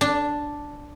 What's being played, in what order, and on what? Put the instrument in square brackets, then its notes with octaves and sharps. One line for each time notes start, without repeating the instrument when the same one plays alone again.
[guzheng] D4